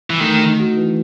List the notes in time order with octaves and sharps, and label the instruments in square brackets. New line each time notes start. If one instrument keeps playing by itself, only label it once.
[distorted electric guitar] E3
[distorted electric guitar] D#3 [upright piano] A3
[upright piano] D#4
F#4
E3